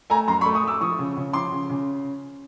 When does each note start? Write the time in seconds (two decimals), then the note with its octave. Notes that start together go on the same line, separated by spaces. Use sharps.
0.10 A3 G#5 A#5
0.27 F#2 A#5 C6
0.41 B5 C#6
0.46 A3
0.54 C#6 D#6
0.64 A3 D6 E6
0.81 F3 C#6 D#6
0.99 C#3
1.17 C#3
1.33 F3 C6 D6
1.52 C#3
1.70 C#3